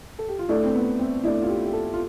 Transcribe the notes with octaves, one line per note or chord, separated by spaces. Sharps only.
A4
G4
F4
A3 D4 E4 A4 D5
C4
B3
C4
A3 D4 E4 A4 D5
F4
G4
G4
A4
F4